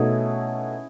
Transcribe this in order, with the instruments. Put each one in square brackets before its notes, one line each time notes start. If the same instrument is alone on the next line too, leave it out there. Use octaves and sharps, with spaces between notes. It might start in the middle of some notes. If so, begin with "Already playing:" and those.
Already playing: [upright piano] B2 A3 D#4 [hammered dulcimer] C#4 E4 G#4